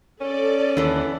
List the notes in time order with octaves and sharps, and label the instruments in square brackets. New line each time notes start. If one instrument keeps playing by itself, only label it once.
[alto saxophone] C#4 [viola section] A4 D5
[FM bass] D#2 [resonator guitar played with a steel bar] D3 E3